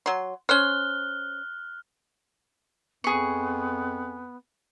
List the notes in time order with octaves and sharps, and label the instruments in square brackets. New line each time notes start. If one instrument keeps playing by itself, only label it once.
[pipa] F#3 C6
[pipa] C#4 C5 [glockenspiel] F6 F#6 G7
[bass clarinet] F2 [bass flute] B3 [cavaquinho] G#4 C#6